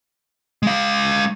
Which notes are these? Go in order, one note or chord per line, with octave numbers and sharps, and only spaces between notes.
G#3 F5